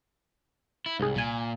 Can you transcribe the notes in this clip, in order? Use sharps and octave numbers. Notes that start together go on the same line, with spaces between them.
E4
C2 G#2 G#4
C2 A#2 G#5